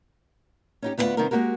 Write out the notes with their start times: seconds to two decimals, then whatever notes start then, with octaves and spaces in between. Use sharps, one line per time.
0.82 C#4 D#4 G4
0.98 D2 B3 E4 F4 D5 F#5
1.17 C3 D#3 G3 B3 D#4 A#4
1.31 G#3 A#3 B3 F#4 G4 A#4